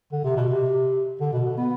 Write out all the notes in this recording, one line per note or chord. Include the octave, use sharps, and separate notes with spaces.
D3
C3
B2
C3
D3
B2
D3
B3